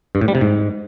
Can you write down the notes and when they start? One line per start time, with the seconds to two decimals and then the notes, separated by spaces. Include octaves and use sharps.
0.15 G2
0.21 A2
0.28 G3
0.35 C3
0.41 G#2